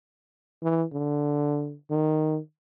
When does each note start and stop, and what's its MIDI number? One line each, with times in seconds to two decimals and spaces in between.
0.63 0.84 52
0.93 1.75 50
1.91 2.39 51